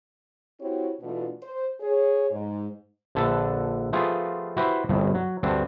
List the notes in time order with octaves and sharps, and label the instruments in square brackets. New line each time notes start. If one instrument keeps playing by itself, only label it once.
[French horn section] C4 E4 F#4 G4 C#5
B2 E3 A3 B3 D4 F4
C5
G#4 C#5
G#2
[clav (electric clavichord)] A#1 D3 A4 B4 A5
F3 A3 B3 F4 G4 G#4
E4 F#4 G4 B4 C5 E5
G1 C2 G2
F#3
D2 G2 C4 D4